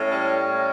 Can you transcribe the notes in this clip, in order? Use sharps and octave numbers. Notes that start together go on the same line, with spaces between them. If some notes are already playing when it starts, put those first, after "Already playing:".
Already playing: A2 C#4
G3
A2